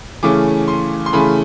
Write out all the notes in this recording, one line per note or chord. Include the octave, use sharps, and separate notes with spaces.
C#3 E3 A3 C#4 D6
C6
C6
C#3 E3 A3 C#4 B5